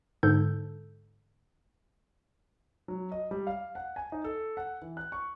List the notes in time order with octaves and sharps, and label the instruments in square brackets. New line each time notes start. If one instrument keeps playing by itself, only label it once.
[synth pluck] G#2 D3 A4 G6
[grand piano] F#3
D#5
G3
F5
F#5
G#5
D#4
A4
F#5
E3
F#6
C#6